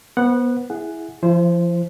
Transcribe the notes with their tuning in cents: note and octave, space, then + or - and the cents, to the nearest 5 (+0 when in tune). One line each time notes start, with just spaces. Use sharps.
B3 -20 C5 +0 F#5 +0
E4 +0 G#4 +0 F#5 +0
F3 -25 E4 +45 C5 +0